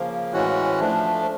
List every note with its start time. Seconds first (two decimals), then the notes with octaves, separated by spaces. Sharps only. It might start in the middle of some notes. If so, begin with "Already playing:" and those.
Already playing: C#3 F3 A#3
0.33 A2 E3 G#3 C#4 F#4
0.80 F3 A3 D4